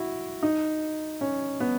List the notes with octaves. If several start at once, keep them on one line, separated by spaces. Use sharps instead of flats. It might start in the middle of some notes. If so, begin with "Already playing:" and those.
Already playing: E4 F#4
D#4
C#4
B3